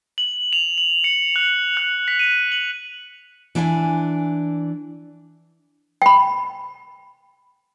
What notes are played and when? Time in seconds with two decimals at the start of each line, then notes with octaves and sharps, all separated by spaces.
0.18 F#7
0.53 F7
0.78 F#7
1.04 C#7
1.36 F#6
1.77 F#6
2.08 B6
2.19 D#7
2.52 F#7
3.55 E3 D4 E4 G5 G#5
6.02 G5 B5